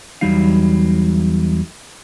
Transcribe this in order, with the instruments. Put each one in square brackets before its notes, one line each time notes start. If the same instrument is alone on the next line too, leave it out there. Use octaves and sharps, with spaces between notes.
[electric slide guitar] E2 F#3 G3 D#4 F5